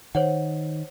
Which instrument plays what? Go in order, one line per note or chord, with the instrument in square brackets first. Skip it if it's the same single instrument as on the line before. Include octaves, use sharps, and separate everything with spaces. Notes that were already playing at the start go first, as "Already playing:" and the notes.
[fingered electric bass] D#3 [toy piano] C5 C#5 F#5